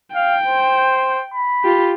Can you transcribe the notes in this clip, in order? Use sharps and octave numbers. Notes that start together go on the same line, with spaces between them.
F5 G5
C5
B5
F4 G4